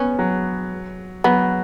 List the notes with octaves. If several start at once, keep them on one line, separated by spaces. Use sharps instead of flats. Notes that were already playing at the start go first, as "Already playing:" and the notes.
Already playing: B3 C#4
F#3
F#3 B3